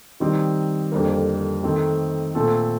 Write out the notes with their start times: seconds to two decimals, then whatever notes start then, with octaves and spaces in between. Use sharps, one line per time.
0.20 D#3 G3 C4 D#4
0.92 F2 D3 G3 A#3
1.63 D#3 A3 C4
2.35 A#2 A3 C4 F4 A4